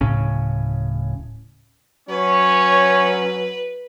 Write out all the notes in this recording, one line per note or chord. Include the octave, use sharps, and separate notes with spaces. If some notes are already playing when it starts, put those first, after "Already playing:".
D1 A2 C#3 C#4
F#3 C#4 B4 C#5